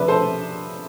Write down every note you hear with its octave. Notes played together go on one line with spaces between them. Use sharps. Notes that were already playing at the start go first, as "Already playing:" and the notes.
Already playing: C3 F3 B4 D5 E5
A4 C5